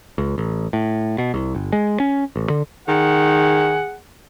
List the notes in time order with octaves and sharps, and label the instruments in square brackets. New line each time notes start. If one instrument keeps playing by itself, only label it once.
[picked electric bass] C#2
A1
A2
B2
C2
G1
G#3
C#4
A1
D3
[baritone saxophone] D#3 [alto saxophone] G#4 [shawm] F#5